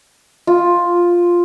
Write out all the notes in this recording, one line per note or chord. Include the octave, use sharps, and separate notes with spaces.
F4